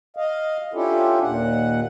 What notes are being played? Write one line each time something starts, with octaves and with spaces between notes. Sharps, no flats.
D#5 F5
C#4 D4 E4 F4 G4 A4
D#2 A#2 F#5